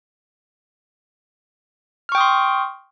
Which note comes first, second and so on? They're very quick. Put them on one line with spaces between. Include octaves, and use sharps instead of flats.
F6 C#6 G5 D#6 C6